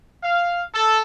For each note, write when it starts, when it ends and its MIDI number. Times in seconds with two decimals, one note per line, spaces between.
0.22 0.63 77
0.73 1.01 69